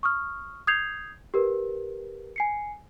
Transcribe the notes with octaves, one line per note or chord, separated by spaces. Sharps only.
C#6 D#6 F6
D#6 G6 G#6 C7 F7
G4 A#4 B4
G#5 C7 C#7